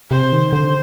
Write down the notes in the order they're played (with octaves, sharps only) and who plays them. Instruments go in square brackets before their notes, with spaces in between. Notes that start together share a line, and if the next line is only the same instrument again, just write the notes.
[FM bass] C3 [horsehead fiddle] C5
[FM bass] D#3
[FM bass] D3 [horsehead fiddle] C5